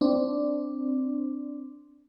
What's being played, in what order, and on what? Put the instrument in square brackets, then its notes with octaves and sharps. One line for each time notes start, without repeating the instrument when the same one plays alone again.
[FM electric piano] C4 D4